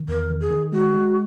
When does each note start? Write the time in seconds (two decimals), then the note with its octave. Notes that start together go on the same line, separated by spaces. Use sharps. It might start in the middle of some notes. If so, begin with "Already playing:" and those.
Already playing: D#3
0.08 E2 A#4
0.30 D#3
0.40 G#4
0.51 D#3
0.72 G#3 F#4
0.94 G#3